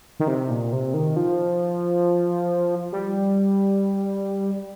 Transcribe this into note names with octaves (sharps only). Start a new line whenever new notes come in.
D#3
C3
A#2
C3
D#3
F3
G3